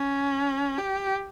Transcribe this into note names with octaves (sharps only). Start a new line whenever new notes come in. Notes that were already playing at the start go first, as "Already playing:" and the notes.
Already playing: C#4
G4